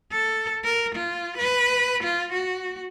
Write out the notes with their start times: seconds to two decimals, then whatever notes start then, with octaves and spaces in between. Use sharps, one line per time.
0.12 A4
0.65 A#4
0.95 F4
1.37 B4
2.04 F4
2.33 F#4